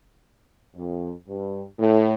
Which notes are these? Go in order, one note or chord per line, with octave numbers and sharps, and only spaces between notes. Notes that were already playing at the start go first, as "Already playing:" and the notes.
F2
G2
A2